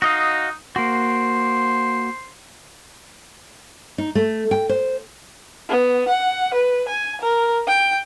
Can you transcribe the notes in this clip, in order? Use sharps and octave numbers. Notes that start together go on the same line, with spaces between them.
D#4 F#4 D#5 F5
A#3 F#4 C5
D#4
A3
G5
C5
B3
F#5
B4
G#5
A#4
G5